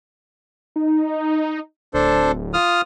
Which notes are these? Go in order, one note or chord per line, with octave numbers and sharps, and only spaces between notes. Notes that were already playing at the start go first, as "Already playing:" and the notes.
D#4
D1 D4 A4 C5
F4 D#6 F6